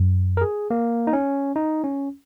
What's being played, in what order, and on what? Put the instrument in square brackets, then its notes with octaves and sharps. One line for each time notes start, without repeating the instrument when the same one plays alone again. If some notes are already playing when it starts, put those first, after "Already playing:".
Already playing: [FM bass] F#2
[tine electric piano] A#4
G#4
A#3
D#4
C#4
D#4
C#4